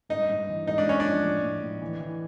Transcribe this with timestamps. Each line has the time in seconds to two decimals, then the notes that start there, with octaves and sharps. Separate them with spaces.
0.09 G2 D#4
0.29 G2
0.48 E3
0.67 G#2 D#4
0.78 D4
0.86 G#2 C#4
1.00 D4
1.05 F3
1.24 A2
1.43 A2
1.62 A2
1.81 E3
2.00 E3